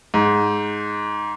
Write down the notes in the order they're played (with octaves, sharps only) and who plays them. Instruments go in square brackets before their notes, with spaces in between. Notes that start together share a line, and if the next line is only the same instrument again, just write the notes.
[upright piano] G#2